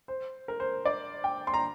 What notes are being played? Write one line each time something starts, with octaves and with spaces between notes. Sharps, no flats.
C5
A#4
C5
D5
G5
C6
A#5